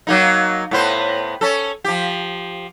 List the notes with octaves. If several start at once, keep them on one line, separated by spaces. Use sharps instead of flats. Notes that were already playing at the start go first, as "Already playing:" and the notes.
F#3 A#3 D#4
A2 B3 C5
C#4 A4
F3 G4